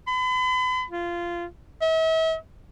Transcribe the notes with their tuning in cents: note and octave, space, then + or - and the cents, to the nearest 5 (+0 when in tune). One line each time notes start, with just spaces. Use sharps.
B5 +40
F4 -15
E5 -40